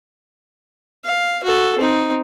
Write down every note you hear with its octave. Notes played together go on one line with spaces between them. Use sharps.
F5
F#4 A4
C4 D#4